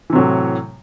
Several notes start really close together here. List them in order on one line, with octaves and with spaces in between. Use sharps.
E3 C3 F#3 A2